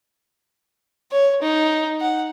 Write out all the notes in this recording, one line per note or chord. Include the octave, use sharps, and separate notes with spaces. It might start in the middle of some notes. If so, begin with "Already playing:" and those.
C#5
D#4
F#5